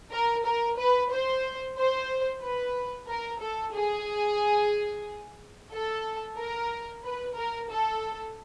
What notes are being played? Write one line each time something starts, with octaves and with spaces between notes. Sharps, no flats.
A#4
A#4
B4
C5
C5
B4
A#4
A4
G#4
A4
A#4
B4
A#4
A4